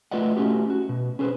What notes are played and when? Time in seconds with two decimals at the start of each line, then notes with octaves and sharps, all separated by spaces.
0.11 A3 F4 B4 D5 D#5 F#5
0.37 A3 C#4 F#4 G4
0.70 F#4
0.89 B2
1.19 C#4 G#4 A4 B4 C5